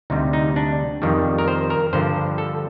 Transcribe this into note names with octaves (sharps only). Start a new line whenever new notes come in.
D2 C3 G3 D#4
D#4
D4
F2 D#3 G3
A#4
C5
A#4
G2 D3 F3 C5
A4